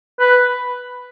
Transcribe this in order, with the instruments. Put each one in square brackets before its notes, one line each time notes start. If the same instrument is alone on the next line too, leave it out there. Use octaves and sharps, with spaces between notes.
[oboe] B4